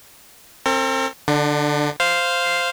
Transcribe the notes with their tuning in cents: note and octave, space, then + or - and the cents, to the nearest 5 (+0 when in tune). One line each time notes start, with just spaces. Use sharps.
C4 +30 A#4 -45
D3 +0 D4 +35
C5 -5 F5 -5